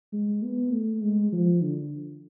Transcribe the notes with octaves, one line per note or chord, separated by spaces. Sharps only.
G#3
B3
A3
G#3
F3
D3